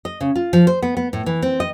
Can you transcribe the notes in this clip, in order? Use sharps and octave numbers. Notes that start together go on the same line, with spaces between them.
D#5
C#3
F4
F3
C5
B3
B3
A2
E3
C4
D#5